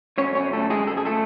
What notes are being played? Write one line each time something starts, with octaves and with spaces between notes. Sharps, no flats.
F#2 D3 C#4 C#5
C#4 C#5
A3 A4
G#3 G#4
A4
G#4
A3 A4